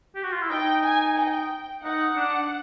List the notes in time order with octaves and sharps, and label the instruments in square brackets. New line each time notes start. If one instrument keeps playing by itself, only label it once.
[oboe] G4
F#4
F4
E4
[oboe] D#4 [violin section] G5
[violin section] G#5
G5
[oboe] D#4 [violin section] F#5
[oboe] D4